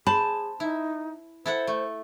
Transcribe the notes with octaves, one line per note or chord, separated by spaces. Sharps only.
G#4 C5 A5 B5
D#4 E4
E4 A4 C5 F#5
A3